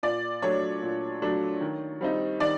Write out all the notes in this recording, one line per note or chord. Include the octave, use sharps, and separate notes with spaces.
A#2 D5
F#3 A3 D4 C#5
A#2
F#3 A3 D4
D#3
G3 C4 D#4
D#3 D5